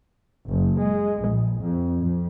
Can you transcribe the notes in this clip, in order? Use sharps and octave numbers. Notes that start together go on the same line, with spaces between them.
F#1
G#3
A#1
F2
F2